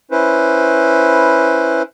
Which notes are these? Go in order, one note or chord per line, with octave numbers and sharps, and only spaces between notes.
C#4 E4 B4 C5